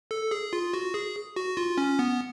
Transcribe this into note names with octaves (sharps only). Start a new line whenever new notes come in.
A4
G#4
F4
F#4
G#4
F#4
F4
C#4
B3